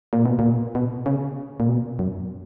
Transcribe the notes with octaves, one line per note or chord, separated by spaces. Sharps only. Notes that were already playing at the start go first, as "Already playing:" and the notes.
A#2
B2
A#2
B2
C#3
A#2
B2
F#2